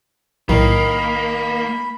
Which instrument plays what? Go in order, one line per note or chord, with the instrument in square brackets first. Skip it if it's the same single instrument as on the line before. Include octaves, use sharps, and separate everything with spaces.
[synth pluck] B1 A2 [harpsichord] D#3 [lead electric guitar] A#3 [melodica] B5